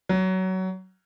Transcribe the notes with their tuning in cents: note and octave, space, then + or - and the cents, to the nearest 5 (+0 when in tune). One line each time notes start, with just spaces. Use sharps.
F#3 +20